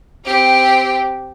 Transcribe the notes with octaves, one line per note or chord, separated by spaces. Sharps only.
C4 G4